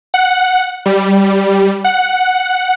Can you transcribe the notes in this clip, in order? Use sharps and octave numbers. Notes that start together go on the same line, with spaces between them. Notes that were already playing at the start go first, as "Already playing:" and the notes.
F#5
G3
F#5